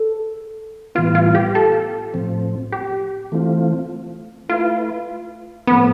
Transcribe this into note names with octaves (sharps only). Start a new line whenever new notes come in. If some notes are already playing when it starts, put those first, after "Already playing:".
Already playing: A4
A2 E3 G3 B3 F4
F4
G4
A4
A2 F3 C4
G4
E3 A3 C4 F4
A3 E4 F4 B4
A2 F3 A3 B3 C4